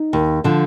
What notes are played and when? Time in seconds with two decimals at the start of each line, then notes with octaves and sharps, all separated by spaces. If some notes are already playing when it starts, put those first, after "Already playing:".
Already playing: D#4
0.13 D#2
0.44 D3 F3